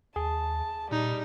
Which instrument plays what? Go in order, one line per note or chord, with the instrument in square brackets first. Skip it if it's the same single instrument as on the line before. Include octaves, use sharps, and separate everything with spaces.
[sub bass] D#2 [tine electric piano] G#4 [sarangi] A5
[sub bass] A#2 [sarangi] G3 [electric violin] D#4